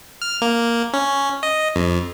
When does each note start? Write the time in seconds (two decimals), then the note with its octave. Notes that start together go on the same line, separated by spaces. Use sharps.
0.22 F6
0.42 A#3
0.93 C#4
1.43 D#5
1.76 F2